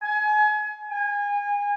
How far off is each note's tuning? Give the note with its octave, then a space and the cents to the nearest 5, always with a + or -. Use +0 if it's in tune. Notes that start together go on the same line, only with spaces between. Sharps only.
G#5 +30
G#5 -30